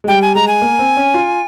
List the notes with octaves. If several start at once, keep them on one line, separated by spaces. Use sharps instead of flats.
G#3
G3 G5
G#5
G#3 A#5
G#5
A#3
C4
C#4
F4